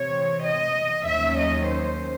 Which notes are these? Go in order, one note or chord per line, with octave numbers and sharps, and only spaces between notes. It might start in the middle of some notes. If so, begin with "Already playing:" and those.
Already playing: C3 E3 C4 C#5
D#5
D#2 D#3 F#3 C#4 E5
D#5
C5